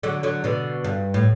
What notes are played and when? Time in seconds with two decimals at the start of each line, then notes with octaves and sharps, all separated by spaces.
0.03 D3 F#3
0.23 D3 F#3
0.44 B2 D3
0.84 G2
1.14 A2